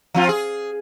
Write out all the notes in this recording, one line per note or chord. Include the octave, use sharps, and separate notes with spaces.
F3 C4 F4
G#4